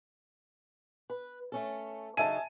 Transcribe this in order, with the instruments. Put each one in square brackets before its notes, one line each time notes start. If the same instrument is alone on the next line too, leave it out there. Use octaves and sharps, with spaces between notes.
[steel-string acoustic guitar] B4
A3 C#4 A4
[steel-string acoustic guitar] C#3 F#3 D#4 [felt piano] E5 D#7 [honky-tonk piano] G#5 A5